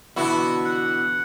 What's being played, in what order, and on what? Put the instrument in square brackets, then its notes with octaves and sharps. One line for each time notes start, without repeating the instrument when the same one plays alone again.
[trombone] B2 [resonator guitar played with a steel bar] D3 E3 B3 [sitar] E4 F#4
[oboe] F#5